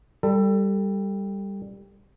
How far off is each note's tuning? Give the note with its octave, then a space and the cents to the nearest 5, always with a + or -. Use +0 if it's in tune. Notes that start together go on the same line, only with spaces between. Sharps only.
G3 +10 A4 +25